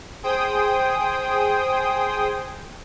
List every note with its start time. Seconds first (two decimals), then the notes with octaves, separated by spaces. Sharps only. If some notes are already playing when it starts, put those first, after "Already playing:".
0.23 G#4 C5 G5 D#6